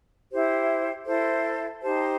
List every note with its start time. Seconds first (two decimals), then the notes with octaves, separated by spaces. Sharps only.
0.32 E4 G4 C5
1.06 E4 A4 C5
1.82 D#4 G4 C5 A5